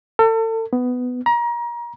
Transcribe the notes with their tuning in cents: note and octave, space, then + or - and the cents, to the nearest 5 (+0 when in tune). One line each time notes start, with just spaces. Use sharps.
A4 +35
B3 +10
A#5 +30